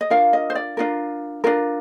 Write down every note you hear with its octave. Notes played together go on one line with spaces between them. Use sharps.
D#5
D4 F4 A#4 F5
D#5
C5
D5
D4 F4 A#4
D4 F4 A#4